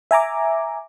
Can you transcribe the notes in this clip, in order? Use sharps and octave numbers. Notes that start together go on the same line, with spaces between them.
E5 G#5 A#5 D6